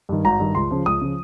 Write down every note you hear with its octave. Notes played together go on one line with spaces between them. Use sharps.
G2 D#3
G#1 A#5
G2 D#3
C#2 C6
C#3 F3
C#2 D#6
C#3 F3